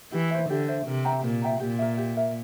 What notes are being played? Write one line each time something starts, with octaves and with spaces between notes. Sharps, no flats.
E3 G4
C5 E5
D3 G4
C5 E5
C3 A#4
E5 G5 A#5
A#2 A#4
E5 G5 A#5
A#2 G4
A#4 E5
G4
A#4 E5